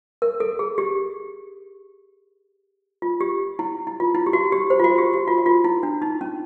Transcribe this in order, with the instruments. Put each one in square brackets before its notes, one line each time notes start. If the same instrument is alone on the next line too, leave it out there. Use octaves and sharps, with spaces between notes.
[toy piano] A#4
A4
G#4
G4
F4
G4
E4
E4
F4
E4
G4
F#4
G4
C5
F4
F#4
G4
F#4
F4
F#4
F4
E4
D4
D#4
C#4